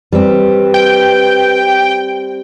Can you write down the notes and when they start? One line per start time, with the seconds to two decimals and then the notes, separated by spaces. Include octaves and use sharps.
0.12 G3 C4 B4
0.74 G5